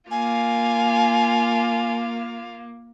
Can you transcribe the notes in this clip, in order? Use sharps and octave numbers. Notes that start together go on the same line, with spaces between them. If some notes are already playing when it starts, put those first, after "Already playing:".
A#3 F4 F5 G#5